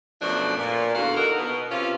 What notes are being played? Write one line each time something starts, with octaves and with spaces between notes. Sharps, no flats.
F#2 B2 F3 A3 D4
A#2
E2 D3 F#4 F5
D#4 F#4 A4 A#4
B2
C3 C#4 F4